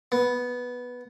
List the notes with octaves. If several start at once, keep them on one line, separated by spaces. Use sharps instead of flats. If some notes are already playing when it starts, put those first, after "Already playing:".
B3